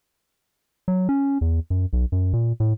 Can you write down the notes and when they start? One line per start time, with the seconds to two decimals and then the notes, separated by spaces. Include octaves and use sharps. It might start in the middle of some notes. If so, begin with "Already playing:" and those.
0.88 F#3
1.09 C#4
1.41 E2
1.70 F#2
1.93 B1
2.12 F#2
2.33 A#2
2.60 A2